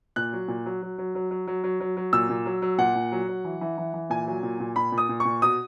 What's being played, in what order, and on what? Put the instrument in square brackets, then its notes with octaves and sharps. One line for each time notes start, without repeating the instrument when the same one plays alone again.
[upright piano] A#2 F#6
F#3
A#2
F#3
F#3
F#3
F#3
F#3
F#3
F#3
F#3
F#3
A#2 E6
A#2
F#3
F#3
A#2 F#5
A#2
F#3
F#3
E3
E3
E3
E3
A#2 G#5
F#3
A#2
A#2
A#2 B5
A#2
D#6
A#2
C#6
A#2
B2 D#6